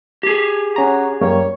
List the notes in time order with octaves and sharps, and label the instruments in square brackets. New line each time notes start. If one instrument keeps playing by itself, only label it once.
[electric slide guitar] G4 G#4
[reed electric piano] C#4 A#5 [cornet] F#4
[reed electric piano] F#2 G3 A#3 [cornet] C#5